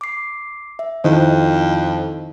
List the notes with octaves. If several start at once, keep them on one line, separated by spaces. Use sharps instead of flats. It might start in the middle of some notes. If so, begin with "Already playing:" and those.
D6 C7
E5
F2 D#3 D#4 E4 C5